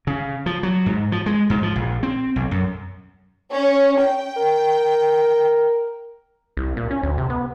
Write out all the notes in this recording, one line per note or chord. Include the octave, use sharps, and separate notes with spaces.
C#3
F3
F#3
G#2
F3
G#3
G#2
F3
A#1
C4
B1
F#2
C#4
G5
A#4
C2
A#2
C#4
D2
C3
B3